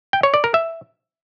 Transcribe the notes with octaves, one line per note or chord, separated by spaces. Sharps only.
G5
C#5
D5
A#4
E5